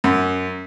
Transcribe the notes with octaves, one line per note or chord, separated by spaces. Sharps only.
F#2